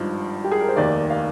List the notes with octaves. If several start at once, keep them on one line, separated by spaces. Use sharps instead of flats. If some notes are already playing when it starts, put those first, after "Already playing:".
Already playing: G#1 G2 F3 D#4
G4
G#4
A#4
C5
F1 D#2 D#3 D5
F5